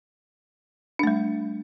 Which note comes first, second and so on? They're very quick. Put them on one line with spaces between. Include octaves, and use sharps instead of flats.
D4 A3 G3